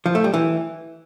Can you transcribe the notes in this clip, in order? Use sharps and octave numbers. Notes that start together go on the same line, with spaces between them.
F3
A3
G3
E3